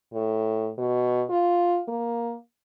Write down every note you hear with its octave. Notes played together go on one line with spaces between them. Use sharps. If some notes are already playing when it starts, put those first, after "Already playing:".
A2
B2
F4
A#3